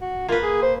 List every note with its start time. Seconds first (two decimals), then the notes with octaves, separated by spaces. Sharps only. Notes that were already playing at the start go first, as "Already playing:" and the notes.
0.01 F#4
0.28 A#3 F4 B4
0.43 G#4
0.62 C5